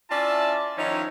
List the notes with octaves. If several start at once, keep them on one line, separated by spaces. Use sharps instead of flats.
C#4 E4 F4 D5 E5 A5
D#3 F3 C#4 D#4 E4 C#5